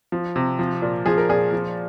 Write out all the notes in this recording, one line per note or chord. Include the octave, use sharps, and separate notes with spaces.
F3
C3
F3
A#2
F3 G#4
A#4
A#2 G#4
F3